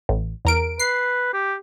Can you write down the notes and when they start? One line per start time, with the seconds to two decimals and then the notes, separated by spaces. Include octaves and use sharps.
0.09 A1
0.45 E2 A#4 D7
0.79 B4 C7
1.33 G4